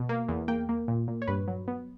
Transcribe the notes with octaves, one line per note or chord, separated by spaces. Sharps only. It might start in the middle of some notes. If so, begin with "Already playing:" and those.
Already playing: B2
A#3
E2
A#3 G5
A#3
A#2
A#2
C#5
G2 B4
F#3
B3